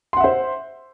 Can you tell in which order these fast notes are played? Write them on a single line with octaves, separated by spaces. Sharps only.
C6 F#5 E5 C5